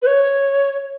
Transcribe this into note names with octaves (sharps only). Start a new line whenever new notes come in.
B4
C#5